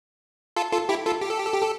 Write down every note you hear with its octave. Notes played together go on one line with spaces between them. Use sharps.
F4 A4
F4 A4
E4 G4
F4 A4
G4
A4
G4
A4
G4
A4